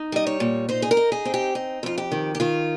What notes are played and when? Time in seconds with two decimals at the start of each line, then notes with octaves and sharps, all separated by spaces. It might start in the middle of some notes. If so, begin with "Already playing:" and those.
Already playing: D#4
0.12 G3 D#5
0.27 C#5
0.40 A#2
0.69 D#4 C5
0.82 G#4
0.91 A#4
0.97 D#4
1.12 G#4
1.25 C4
1.34 G4
1.55 D#4
1.83 F2 F4
1.98 G4
2.12 D#3
2.35 G4
2.40 D#3 F4